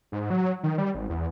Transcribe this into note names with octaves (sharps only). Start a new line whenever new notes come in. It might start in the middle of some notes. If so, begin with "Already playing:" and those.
G#2
F#3
D#3
G3
G#1
E2